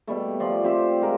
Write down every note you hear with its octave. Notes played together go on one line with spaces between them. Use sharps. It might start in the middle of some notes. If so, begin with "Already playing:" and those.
B2 G3 A3
F3 D5 C6
C4 G4 C5 E5
G#3 F4 A#4